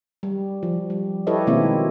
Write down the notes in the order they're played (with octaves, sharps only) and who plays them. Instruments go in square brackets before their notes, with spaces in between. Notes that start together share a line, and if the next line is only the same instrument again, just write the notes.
[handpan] G3
F3
G3
E4 G4 A4 B4 C#5 D#5
B2 D#3 G#3 A#3 C4 E4